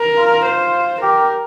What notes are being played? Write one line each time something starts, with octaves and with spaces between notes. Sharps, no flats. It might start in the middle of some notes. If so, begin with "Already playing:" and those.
Already playing: A#4
F4
C5
G4 A#4